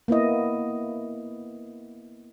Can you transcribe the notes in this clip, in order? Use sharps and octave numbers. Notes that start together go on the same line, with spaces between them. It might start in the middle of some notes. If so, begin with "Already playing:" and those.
A#3 B3 E4 D#5